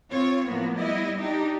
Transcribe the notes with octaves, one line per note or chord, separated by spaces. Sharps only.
C4 F4 C#5
A2 F3 A#3 B3
G3 B3 E4 D#5
D4 D#4 G4